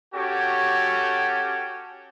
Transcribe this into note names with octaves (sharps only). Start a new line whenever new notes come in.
C#4 F#4 G4 A4 C#5 G5